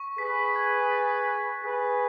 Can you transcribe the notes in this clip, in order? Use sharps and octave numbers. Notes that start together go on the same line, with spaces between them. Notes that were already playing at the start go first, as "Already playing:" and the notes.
Already playing: C#6
G#4 B4 B6
G#6
A6
F#6
G#4 B4 B6